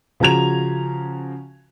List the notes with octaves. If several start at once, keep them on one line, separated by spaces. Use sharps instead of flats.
C#3 F3 F#4 A#5 G#6 F7